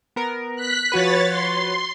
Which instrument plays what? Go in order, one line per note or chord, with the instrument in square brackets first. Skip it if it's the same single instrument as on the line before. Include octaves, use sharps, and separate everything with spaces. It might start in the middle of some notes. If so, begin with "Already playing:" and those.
[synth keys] B3 A#4
[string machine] F#6 B6
[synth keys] F3 F#4 B4 [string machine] C#5 A6
[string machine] C6